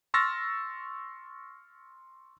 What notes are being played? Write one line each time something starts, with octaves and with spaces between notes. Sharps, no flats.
C6 C#6 E6 F6 A6 A#6